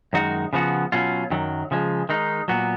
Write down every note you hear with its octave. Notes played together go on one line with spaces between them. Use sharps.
F#2 D#3 G#3 D#4 F#4
C#3 F3 B3 F#4
B2 F#3 C#4 F4
F#2 D#3 F#3
C#3 F3 G#3
D#3 G#3 D#4
A#2 F#3 B3 F#4